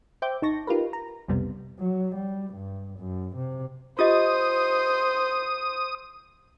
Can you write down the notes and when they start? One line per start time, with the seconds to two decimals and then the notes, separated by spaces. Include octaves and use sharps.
0.22 C5 E5 G5 D6 G6
0.42 G#1 D#4 A5 C#6 A#6
0.67 D#4 F4 G4 A#4 B4
0.93 A#5
1.28 B1 F2 C3 G3 B3
1.79 F#3
2.16 G3
2.54 G2
2.99 F#2
3.36 C3
3.99 F4 G4 C5 D#5 D#6